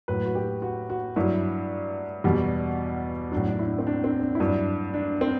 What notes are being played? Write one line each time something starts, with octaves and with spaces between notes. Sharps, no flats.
A2 F#3 B4
F#4
G4
F#4
F#4
G2 F#3 E4
E2 B2 G3
A2 F#3 D4
D4
E4
C4
D4
C4
D4
G2 F#3 E4
D4
D4
C4